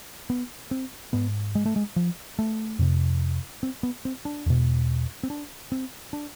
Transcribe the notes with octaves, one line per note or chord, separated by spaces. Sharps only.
B3
C4
G#2 B3
G#3
A3
G#3
F3
A3
F2 C3
C4
B3
C4
D4
E2 B2
C4
D4
C4
D4